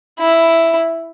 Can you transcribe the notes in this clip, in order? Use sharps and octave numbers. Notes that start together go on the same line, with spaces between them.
E4